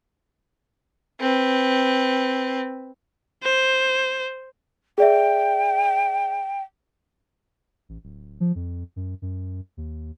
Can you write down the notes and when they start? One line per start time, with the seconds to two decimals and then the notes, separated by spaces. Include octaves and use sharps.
1.20 C4 B4
3.43 C5
4.98 G#4 D5 E5 G5
7.89 A1
8.03 D1
8.40 F3
8.55 F2
8.96 F#2
9.22 F#2
9.77 D#2